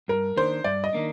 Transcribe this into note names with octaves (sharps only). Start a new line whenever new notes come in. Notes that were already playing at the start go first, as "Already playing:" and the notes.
G2 A#4
D#3 A#3 D4 C5
G2 D5
D#5
D#3 A#3 D4